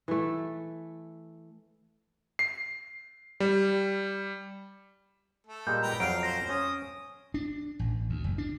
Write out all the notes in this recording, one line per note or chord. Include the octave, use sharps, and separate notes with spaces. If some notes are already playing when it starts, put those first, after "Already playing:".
E3 A3
C7
G3
A3 A4
A#2 G3 G#3 G6
B4 G5 A#5
F2 F#3 F5 D7
C5 A#6
C#4 D#6
D4
A1
D2
F#1
D4